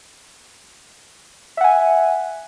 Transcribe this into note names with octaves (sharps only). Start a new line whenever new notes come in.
E5 F#5 G#5